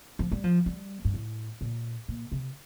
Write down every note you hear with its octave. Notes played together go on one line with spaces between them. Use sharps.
F3
G3
F3
G3
G2
A2
A#2
A#2
C3